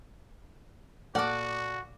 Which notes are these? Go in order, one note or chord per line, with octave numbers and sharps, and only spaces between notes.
A#2 F#4 A4 D5 F#5 D6 F6